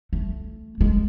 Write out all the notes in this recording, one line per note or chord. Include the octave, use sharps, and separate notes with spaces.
A3
G#3